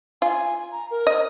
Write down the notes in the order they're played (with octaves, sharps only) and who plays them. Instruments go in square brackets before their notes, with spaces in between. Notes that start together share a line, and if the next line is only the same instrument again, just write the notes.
[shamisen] F4 [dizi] G#5
[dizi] A#5
A#4
[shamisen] D#5